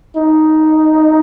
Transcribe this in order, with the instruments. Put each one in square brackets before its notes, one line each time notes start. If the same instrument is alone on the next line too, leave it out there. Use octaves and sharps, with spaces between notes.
[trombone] D#4